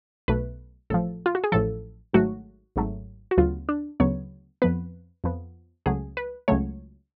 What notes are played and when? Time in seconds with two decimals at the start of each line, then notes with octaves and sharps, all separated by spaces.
0.28 B1 B2 A3 B4
0.90 A1 A2 F3 A4
1.26 F4
1.35 F#4
1.44 G#4
1.52 A1 A2 F3 A4
2.13 G#1 G#2 F#3 A3 F#4
2.76 G#1 G#2 F#3 A3
3.31 F#4
3.37 D2 C#3 F#3 B3 F4
3.69 D4
4.00 D2 C#3 F#3 B3 C#5
4.62 F2 F3 B3 B4
5.24 F2 F3 B3
5.86 C#2 C#3 F#3 A3 G#4
6.17 B4
6.48 C#2 C#3 F#3 A3 C#5